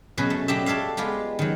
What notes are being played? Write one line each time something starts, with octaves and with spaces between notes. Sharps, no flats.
B2 F#3 C#4 G#4 B4
A3
F#3 D4 G4 D#5 E5
D4 A4 C#5 E5 F5
G#3 B3 F4 G4
D#3 F#3